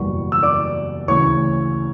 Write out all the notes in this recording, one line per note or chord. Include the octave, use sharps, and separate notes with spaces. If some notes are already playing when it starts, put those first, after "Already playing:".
Already playing: F#1 E2 B2 G3 C#6
E6
D5 D6
D2 C#3 E3 C#5 C#6